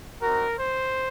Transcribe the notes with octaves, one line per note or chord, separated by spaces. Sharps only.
C4 D#4 F#4 A#4
C5